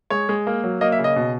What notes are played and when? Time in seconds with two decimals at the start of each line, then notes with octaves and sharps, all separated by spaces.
0.10 G#3 C#5
0.29 G#3
0.47 A#3
0.64 F#3
0.81 A#3 D#5
0.92 E5
0.99 C#3
1.04 D#5
1.16 B2